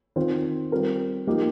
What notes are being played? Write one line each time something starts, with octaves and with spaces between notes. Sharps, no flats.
D#3 C4 F4 C5
G3 C4 F4 A#4
F3 A#3 D#4 G4